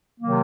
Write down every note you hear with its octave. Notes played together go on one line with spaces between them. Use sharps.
C3 D#3 F#3 A#3